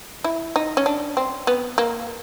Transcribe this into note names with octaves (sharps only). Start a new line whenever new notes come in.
E4
D#4
C#4
D4
C4
B3
A#3